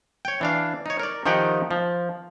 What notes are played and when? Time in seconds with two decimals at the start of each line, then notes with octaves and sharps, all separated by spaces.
0.25 C#5 G5
0.41 E3 D4 F5
0.86 D#4 C#5
0.99 A#4 D5
1.26 D#3 F3 D#4 G4 F#5 G5
1.71 F3